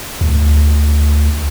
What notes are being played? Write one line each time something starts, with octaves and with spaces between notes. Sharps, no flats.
D2